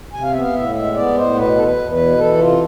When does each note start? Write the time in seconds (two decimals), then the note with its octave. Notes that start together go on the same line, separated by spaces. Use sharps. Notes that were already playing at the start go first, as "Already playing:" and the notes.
0.13 C3 G#5
0.23 F5
0.32 B3 E5
0.41 F5
0.53 A2 E5
0.74 G#3 E5
0.94 B3 D5
1.15 A2 C5
1.35 B2 B4
1.56 E2 A4
1.63 B4
1.77 E2
1.91 B4
1.97 B2
2.17 E3 A4
2.38 C3 F4